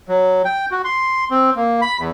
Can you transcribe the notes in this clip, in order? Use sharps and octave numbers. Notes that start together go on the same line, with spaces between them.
F#3
G5
F#4
C6
C4
A#3
B5
E2